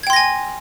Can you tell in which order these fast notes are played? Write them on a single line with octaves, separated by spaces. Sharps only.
G#6 G5 C6 A#6 G#5